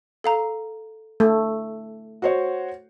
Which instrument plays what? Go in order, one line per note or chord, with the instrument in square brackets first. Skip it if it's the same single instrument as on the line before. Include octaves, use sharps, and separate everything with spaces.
[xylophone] A4 F5 A#5
[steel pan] A3
[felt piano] F#4 C5 C#5